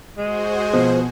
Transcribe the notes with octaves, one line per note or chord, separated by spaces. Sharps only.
G#3 F#4 G#4 C5
B2 F3